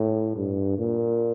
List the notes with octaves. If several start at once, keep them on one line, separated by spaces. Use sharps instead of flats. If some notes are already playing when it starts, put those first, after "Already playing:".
Already playing: A2
G2
A#2